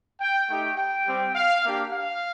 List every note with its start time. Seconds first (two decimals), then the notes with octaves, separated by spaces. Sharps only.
0.20 G5
0.48 A3 D#4 G4 G5
0.77 G5
1.06 G3 C4 G4
1.35 F5
1.64 A#3 D4 G4
1.93 F5